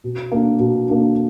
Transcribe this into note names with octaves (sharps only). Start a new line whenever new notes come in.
B2
A#3 D4
B2
A#3 D4